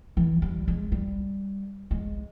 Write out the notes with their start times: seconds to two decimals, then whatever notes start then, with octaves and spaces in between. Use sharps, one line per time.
0.17 E3
0.42 G3
0.68 G#3
0.92 G3
1.91 G#3